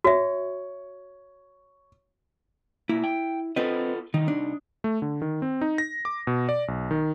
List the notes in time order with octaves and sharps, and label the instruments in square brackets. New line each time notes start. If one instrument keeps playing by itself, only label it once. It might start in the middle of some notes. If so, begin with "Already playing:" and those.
[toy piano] F#4 E5 [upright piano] C#5
[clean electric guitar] B2 A#3 [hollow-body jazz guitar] E4
[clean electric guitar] G5
[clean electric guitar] B3 F4 A4 [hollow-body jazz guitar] C4 B4 D#5
[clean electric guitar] C2 D#4 [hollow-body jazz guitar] D#3
[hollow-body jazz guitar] D4
[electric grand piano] A3
D3
D#3
C4
D#4
A#6
D6
B2
D5
B1
D#3